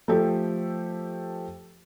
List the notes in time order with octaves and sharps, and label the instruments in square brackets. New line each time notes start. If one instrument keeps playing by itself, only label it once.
[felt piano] F3 A3 G4 A4